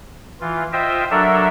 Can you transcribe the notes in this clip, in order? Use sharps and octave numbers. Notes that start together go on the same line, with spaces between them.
E3 F4
F4 C5 D#5 E5 G5
F#3 D4 A4 A#4 E5